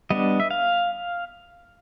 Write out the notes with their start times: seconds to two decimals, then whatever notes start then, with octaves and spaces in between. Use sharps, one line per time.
0.10 G3 B3 D4 D#5
0.40 E5
0.51 F5